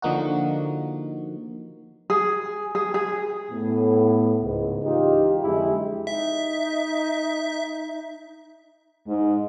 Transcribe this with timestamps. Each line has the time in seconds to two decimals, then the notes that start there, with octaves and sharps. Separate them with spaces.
0.02 D3 F3 A#3 D#4 F#4
2.10 G#4
2.75 G#4
2.94 G#4
3.51 A2 B3
4.42 C#2 G#2
4.84 C#2 E3 D#4 F4 G4
5.43 F2 D3 F#3 G#3 E4 G4
6.07 D#4 E5
9.08 G#2